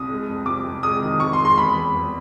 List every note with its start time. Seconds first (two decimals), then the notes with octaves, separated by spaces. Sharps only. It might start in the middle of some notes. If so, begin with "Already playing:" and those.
Already playing: C2 D#6
0.09 G#3
0.29 F2
0.46 C3 D6
0.65 F2
0.83 G#3 D#6
1.01 D#3
1.20 F2 C#6
1.33 C6
1.39 G#3
1.45 C6
1.58 E2 B5
1.76 E2
1.94 E2